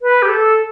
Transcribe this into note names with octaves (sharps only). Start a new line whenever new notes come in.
B4
G4
A4